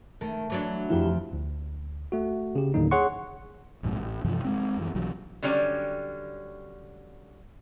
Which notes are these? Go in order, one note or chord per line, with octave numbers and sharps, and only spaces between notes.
D#3 A3
E3 F#3 D4
F2 F3 E4 G4
D2
A3 F#4
C#3 G4
D#2 A2 D3 F#3 A#3 D#4
G#4 C#5 F#5 C6 C#6
A#1 F2 G#2 C3
A1
G2 C3 E3 F3
G#3 C4
F#2 E3
B1 E3 F#3
D3 F#3 G3 C#4